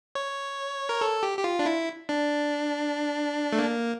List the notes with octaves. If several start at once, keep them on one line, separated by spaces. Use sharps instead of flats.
C#5
A#4
A4
G4
G4
F4
D4
E4
D4
A3
A#3